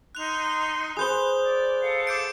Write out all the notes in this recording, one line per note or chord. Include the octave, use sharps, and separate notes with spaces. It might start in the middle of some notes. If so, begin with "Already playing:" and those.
D#4 C6 F#6 F7
G#4 B4 C5 D#6 G6 G7
D5
A4 F5 F#5
D6 G6 D7